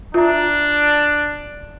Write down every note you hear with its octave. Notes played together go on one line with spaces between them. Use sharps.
D4 F4 E5 A#5